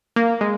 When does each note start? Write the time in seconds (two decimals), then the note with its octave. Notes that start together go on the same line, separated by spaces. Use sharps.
0.16 A#3
0.41 G#3